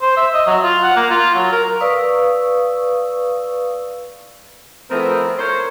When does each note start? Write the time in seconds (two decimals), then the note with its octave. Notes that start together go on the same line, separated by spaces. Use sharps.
0.02 C5
0.17 E5
0.34 D#5
0.47 F#3
0.64 F4
0.83 F#5
0.97 A#3
1.11 F4
1.35 F#3
1.52 A#4
1.80 B4 D5 F5 C#6 D#6 E6
4.90 F3 A3 B3 C4 E4 A#4
5.38 A#4 C5 C#5